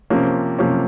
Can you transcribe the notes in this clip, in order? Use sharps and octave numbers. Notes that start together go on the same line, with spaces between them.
C3 F3 A#3 C#4
C3 F3 A#3 C#4